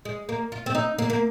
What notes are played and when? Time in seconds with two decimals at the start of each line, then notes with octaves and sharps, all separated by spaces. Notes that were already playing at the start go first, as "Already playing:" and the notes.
0.05 G#3
0.29 A#3
0.52 F4
0.66 C4
0.75 D#4
0.98 A#3
1.10 A#3